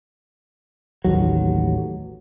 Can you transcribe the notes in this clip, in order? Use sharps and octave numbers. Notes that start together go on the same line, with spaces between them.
A1 D#2 F#3